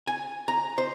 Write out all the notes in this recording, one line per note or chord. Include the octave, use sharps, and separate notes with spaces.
G#5
A#5
C5